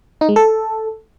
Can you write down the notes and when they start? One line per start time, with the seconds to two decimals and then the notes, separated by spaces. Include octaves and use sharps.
0.21 D#4
0.29 G#3
0.36 A4